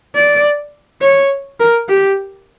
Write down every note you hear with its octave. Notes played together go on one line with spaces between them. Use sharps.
D5
C#5
A#4
G4